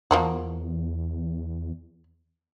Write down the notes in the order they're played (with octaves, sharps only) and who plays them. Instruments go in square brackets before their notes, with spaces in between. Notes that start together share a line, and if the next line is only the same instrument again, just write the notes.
[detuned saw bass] E2 [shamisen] F3 A#3 F#4